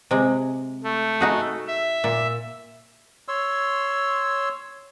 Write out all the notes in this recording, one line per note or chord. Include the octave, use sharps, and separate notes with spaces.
C3 G#3
A3
D#4 F#4 G#4
E5
A#2
C#5 C6 E6